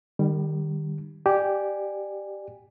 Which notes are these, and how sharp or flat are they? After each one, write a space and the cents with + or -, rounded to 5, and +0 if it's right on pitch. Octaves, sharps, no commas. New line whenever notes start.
D#3 -30 G3 +10
G4 -5 D5 +25 G#5 -10